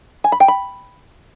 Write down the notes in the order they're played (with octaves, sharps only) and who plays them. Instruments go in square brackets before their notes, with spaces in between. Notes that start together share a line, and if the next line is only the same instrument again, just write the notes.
[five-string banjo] G#5
B5
G5
B5